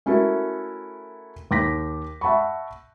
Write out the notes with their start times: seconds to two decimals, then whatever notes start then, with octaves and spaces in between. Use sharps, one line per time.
0.06 A3 C#4 E4 F#4 A4 A#4
1.51 D#2 D6 A#6 B6
2.21 E5 F#5 A5 B5 C#6